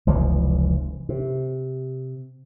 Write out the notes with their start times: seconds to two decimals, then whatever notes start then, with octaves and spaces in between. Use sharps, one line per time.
0.07 F1 C#2 E3 F3
1.09 C3